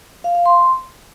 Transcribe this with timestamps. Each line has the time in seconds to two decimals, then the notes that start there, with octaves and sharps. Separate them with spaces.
0.24 F5
0.35 F5
0.46 C6